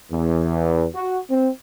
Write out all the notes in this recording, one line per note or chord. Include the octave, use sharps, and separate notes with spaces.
E2
F#4
C4